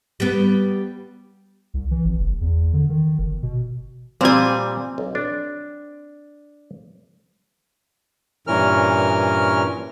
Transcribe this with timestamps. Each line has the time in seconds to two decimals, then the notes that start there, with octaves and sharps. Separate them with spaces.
0.20 G3 B3
1.74 C2
1.91 E3
2.05 G#1
2.19 F#1
2.41 E2
2.73 D3
2.89 D#3
3.19 G1
3.43 B2
4.21 A#2 G3 C4 G#5
4.98 B1
5.15 D4
8.47 G2 A#2 E3 C#4 A#4 F6